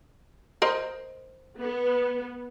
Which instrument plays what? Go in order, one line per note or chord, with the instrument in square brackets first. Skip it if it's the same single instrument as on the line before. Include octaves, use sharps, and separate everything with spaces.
[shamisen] A#4 C5 D#5
[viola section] B3